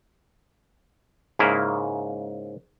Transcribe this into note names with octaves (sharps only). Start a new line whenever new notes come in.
G#2 C#3 A#3 E4